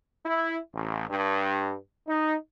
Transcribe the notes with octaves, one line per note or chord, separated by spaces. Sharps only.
E4
A1
G2
D#4